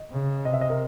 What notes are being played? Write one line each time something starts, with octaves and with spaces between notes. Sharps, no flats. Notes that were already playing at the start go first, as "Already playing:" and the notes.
Already playing: D#5
C#3
C3 D#5
E5
D#5
A#4